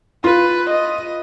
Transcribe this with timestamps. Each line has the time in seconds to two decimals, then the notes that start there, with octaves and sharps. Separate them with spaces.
0.24 F4 B4
0.70 D#5